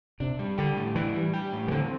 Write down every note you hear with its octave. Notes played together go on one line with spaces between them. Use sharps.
C3 D4
G3
D3 G4
A2
E3 D4
G3
G4
A2
E3
D3 C4